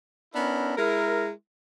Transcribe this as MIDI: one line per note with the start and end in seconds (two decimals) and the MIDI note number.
0.34 0.74 59
0.34 0.74 61
0.34 0.74 62
0.34 0.74 64
0.34 0.74 70
0.77 1.29 56
0.77 1.29 64
0.77 1.29 70